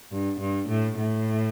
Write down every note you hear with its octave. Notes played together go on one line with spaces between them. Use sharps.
G2
G2
A2
A2